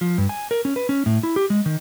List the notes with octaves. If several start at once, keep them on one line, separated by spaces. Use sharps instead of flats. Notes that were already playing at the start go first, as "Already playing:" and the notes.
F3
G2
G#5
A#4
C#4
B4
C#4
A2
E4
G4
G#3
D#3